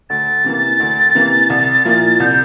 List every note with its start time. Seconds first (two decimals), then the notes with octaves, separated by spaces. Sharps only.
0.10 D2 A6
0.44 C3 E3 A#3
0.80 D2
1.15 C3 E3 A#3
1.50 C2
1.85 A#2 F3 A#3 E4
2.20 C2 G6